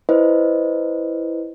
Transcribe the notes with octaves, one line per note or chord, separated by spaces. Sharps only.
E4 B4 C5 D#5